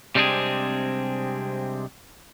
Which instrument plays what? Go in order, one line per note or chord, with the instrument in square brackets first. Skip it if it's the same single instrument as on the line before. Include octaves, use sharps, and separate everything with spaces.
[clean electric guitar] C3 G3 G#3 C4 D4 G#4